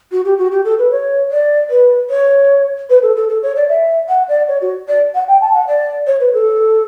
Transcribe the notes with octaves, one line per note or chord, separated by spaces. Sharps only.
F#4
G4
F#4
G4
A4
B4
C#5
D5
B4
C#5
B4
A4
A4
A4
C#5
D5
E5
F#5
D5
C#5
F#4
D5
F#5
G5
A5
F#5
D5
C#5
B4
A4